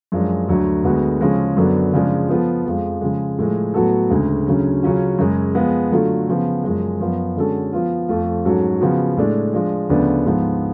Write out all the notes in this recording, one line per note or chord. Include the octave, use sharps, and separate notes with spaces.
F#2 F3 G#3 D4
D2 D3 F#3 A3
D2 D3 G#3 B3 F#4
C#3 F3 G#3 C#4
F#2 D3 F#3 B3 D4
C#3 F3 G#3 D4
F3 B3 F4 A4
F2 F3 G#3
C#3 F3 G#3
A2 F3 G#3
A2 F#3 B3 F#4 A4
D2 C#3 G#3
D2 C#3 F#3 C#4
C#3 F#3 C#4 F4
F#2 C#3 G#3
F3 G#3 B3 F4
D3 F#3 A3 F4
C#3 F3 B3
F#2 F3 G#3
F#2 F3 B3
D3 G#3 C#4 F#4 A4
F3 B3 F4
F2 F3 A3 F4
G#2 F#3 C#4 F#4 A4
C#3 F3 B3 F#4
A2 G#3 D4
F3 G#3 D4
D2 C#3 F3 B3 D4
G#2 F3 B3